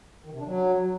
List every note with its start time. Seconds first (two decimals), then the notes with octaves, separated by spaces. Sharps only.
0.24 D#3
0.31 C3
0.39 D4
0.46 F#3